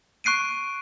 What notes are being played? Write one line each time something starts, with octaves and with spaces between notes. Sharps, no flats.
C#6 F#6 C7 D7 D#7